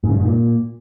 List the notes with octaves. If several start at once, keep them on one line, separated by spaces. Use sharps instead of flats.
G#2
C#3
G2
G#2
A#2